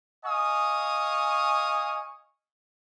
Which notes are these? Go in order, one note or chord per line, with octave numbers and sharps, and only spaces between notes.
D#5 F5 G#5 C#6 D#6